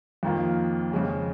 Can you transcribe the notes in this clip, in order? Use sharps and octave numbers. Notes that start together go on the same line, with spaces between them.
F2 D#3 A#3 F4
F2 C#3 G#3 C#4